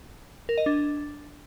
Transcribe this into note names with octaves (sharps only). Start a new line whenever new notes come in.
A#4
D#5
D4